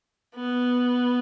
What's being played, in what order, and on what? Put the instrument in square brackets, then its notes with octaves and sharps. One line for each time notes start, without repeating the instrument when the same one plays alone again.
[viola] B3